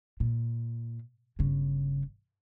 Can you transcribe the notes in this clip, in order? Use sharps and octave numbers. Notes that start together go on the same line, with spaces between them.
A#2
G1 C#3